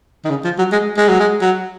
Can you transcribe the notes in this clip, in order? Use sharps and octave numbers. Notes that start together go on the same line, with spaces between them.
D#3
C#3
F3
F#3
G#3
G#3
F#3
G#3
F#3